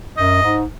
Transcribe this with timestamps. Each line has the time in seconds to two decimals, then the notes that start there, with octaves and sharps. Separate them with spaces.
0.17 F#2 D#5
0.43 G#2